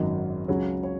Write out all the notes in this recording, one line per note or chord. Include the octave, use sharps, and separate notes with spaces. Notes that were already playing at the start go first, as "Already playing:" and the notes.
Already playing: G#1 F#2 D#3 F#3 D#5
C#2 C#3 F#3 C#5
C#5